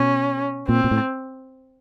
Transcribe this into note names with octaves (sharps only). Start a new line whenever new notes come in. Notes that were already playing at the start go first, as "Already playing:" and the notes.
Already playing: B2 C#4
A#2 C4
A#2
A2